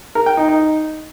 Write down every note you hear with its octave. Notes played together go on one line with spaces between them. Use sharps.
A#4
G5
D#4
D#4